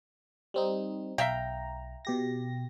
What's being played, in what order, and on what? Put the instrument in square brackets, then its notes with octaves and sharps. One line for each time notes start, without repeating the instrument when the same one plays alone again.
[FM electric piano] G3 C4 D#4
[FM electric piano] B1 A#5 [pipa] E5 F5 G5
[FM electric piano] B2 G4 A#6